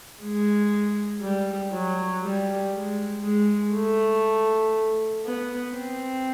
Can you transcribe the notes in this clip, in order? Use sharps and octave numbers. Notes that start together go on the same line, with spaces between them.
G#3
G3
F#3
G3
G#3
G#3
A3
B3
C4